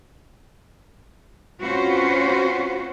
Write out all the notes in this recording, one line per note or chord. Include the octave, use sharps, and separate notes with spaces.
C4 C#4 F4 F#4 B4 C5